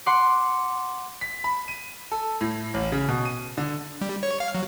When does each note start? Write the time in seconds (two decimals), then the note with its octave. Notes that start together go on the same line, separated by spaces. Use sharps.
0.06 F#5 C6 D6 C7
1.21 B6
1.44 B5
1.68 D#7
2.12 A4
2.41 A2
2.74 A1
2.92 C#3
3.08 B2
3.25 D#7
3.58 D3
4.01 G3
4.23 C#5
4.40 F5
4.55 F#3